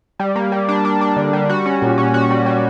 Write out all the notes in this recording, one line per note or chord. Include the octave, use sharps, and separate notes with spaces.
G3
A#3
G3
D4
D4
D4
D3
G3
F#4
C#4
A#2
C#4
F#4
G3
G3